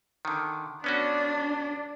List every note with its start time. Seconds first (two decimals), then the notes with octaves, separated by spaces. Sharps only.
0.25 D3 D#3
0.84 B3 C#4 D4 F#4